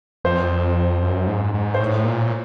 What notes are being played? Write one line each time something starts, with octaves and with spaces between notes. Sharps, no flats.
F2 C5
F#2
G#2
G#2
C5
A2 C#5
A#2